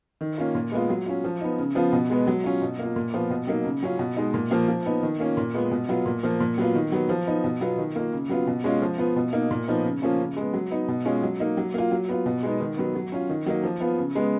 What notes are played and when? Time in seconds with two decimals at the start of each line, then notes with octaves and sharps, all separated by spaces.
0.21 D#3
0.38 A#3 C#4 F4
0.55 A#2
0.72 G#3 B3 F4
0.89 F#3
1.06 C#4 F4
1.24 F3
1.41 B3 D#4
1.58 C#3
1.75 F3 B3 F4
1.93 B2
2.10 G#3 B3
2.27 F#3
2.44 C#4 F4
2.62 B2
2.79 A#3 F4
2.96 A#2
3.14 F3 B3 F4
3.30 B2
3.47 F#3 A#3 D#4
3.65 C#3
3.83 F#3 C#4 F4
3.99 B2
4.16 G#3 D#4
4.34 A#2
4.51 F3 A#3
4.68 F3
4.86 B3 D#4
5.03 D#3
5.20 A#3 C#4 F4
5.37 A#2
5.54 G#3 B3 F4
5.71 B2
5.89 F#3 B3 F4
6.06 A#2
6.23 F3 A#3
6.40 A#2
6.58 F#3 B3 F4
6.75 D#3
6.92 F#3 B3
7.09 F3
7.27 B3 D#4
7.44 B2
7.61 F#3 B3 F4
7.78 D#3
7.96 A#3 F4
8.12 C#3
8.30 F#3 B3 F4
8.47 B2
8.64 G#3 C#4 F4
8.81 F3
8.98 B3 F4
9.16 B2
9.33 A#3 D#4
9.51 A#2
9.68 F3 B3 D#4
9.84 C#3
10.02 F3 A#3 C#4 F4
10.19 C#3
10.37 G#3 B3
10.53 F#3
10.71 B3 D#4
10.88 B2
11.05 G#3 C#4 F4
11.23 F#3
11.40 A#3 D#4
11.57 F#3
11.74 A#3 F4
11.91 F#3
12.09 B3 F4
12.26 B2
12.43 G#3 B3 D#4
12.60 D#3
12.77 F#3 B3
12.95 F#3
13.12 C#4 F4
13.29 D#3
13.46 F#3 A#3 D#4
13.63 F3
13.81 B3 F4
13.98 C#3
14.15 G#3 B3